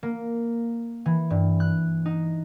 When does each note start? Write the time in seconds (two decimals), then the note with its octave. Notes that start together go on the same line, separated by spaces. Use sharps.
0.03 A#3
1.06 E3
1.30 G2
1.60 F#6
2.05 D#4